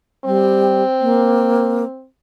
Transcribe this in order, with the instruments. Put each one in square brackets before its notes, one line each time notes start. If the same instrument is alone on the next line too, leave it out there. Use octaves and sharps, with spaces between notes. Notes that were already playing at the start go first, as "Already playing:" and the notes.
[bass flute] G3 [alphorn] C4
[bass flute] A#3